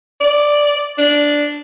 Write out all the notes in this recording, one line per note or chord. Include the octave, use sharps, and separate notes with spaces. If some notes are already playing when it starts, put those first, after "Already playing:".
D5
D4